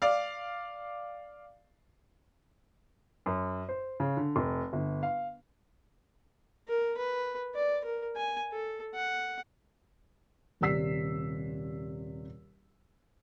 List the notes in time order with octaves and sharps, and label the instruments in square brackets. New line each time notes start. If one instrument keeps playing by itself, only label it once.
[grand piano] D5 F5
[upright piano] F#2
C5
C#3
D3
F1
G1
F5
[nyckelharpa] A#4
B4
D5
A#4
G#5
A4
F#5
[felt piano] D#1 C3 D5 E6 B6 C7